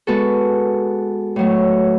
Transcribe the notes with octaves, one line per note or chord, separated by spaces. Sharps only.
G#3 B3 F#4 A4
A2 F#3 A3